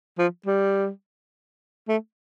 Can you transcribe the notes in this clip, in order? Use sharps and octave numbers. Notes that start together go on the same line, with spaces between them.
F3
G3
A3